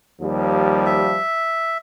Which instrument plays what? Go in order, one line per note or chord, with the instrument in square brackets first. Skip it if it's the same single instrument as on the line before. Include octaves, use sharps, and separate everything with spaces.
[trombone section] D#2 F3 G3
[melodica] E5